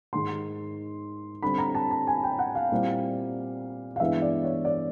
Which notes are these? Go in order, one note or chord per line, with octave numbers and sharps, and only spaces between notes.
G#2 D#3 G#3 C6
D3 G3 C4 B5
A#5
A5
A5
G#5
G5
F#5
F5
A#2 G3 C4 E4
F5
G2 E3 G#3 B3 E4 E5
D5
C#5
D5